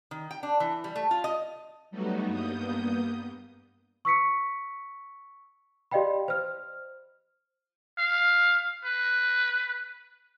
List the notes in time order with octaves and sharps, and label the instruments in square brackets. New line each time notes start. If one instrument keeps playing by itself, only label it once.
[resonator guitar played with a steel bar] D#3
G5
D4
E3
G3
A3
F4
D#5
[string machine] F#3 G3 A3 B3 D#4 F#4
G2 A#3 B3 D#6 G6
[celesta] C#6 E6 B6 C#7
G4 D5 D#5 F5 G5 B5
C5 F6
[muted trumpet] F5
B4